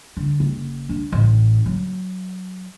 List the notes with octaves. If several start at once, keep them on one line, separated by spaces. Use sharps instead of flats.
D3
F#1
D4
A1
F#3